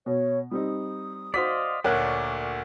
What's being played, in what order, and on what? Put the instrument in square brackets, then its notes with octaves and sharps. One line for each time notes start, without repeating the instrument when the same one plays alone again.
[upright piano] B2 [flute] C#5
[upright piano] G3 C4 D#4 [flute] D#6
[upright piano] F#4 C5 C6 [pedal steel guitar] D5 D#5 F5 [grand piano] B6
[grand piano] D2 A#2 [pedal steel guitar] F#4 D5 [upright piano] A#4 C#5 F#6